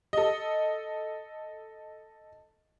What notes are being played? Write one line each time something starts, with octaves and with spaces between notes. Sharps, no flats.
A4 D#5